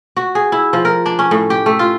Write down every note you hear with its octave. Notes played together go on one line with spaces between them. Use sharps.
F#4
G#4
E4
F3
A#4
D4
C#4
A2
G4
A3
F4